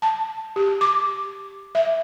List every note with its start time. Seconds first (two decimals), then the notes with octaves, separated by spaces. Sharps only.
0.02 A5
0.56 G4
0.81 D6
1.75 E5